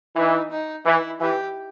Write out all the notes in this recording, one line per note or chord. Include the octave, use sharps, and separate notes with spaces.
E3 D#4
D#4
E3 E4
E3 G4